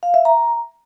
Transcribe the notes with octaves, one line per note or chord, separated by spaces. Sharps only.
F5
E5
A#5